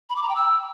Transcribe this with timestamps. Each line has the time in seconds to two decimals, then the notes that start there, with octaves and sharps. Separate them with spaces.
0.10 B5
0.16 D6
0.23 A#5
0.29 G5
0.36 E6